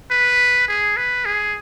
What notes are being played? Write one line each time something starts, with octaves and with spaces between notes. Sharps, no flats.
B4
G#4
B4
G#4